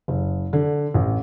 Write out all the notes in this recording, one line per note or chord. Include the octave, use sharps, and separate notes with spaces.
F#1
D3
A1